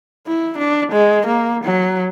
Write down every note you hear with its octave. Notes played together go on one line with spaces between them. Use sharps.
E4
D4
G#3
A#3
F#3